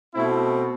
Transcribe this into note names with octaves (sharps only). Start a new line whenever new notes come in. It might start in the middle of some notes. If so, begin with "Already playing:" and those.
B2 A3 C4 E4